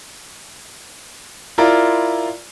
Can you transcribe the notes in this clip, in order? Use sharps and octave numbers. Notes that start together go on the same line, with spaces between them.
E4 F4 A#4 D5